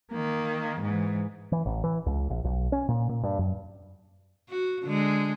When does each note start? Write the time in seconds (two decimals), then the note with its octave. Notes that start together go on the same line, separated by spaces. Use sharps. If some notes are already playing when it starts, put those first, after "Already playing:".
0.12 D#3 A#3
0.81 G#2 E3
1.52 E3
1.66 A1
1.84 E3
2.06 C#2
2.30 A#1
2.44 B1
2.72 C#4
2.89 A#2
3.09 A#2
3.23 G2
3.39 F#2
4.49 F#4
4.84 D3 G#3